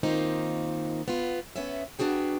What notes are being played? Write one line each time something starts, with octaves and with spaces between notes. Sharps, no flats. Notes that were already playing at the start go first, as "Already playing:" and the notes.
D#3 A#3 C4 D#4 F4
B3 F4
B3 C#4 E5
B3 D4 F#4 G#4 G5